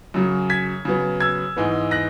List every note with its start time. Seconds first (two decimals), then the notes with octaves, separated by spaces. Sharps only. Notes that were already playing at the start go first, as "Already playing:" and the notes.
0.14 F#2 C#3 F#3
0.50 G#6 B6
0.85 C#3 F#3 B3
1.20 E6 G#6
1.57 G#2 E3 G#3 B3
1.91 F#6 A#6